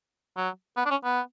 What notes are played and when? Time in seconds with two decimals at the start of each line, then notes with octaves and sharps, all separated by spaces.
0.37 F#3
0.77 B3
0.86 D4
0.91 C#4
1.05 B3